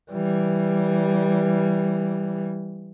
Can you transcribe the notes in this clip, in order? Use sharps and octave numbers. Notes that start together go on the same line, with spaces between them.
E3 G3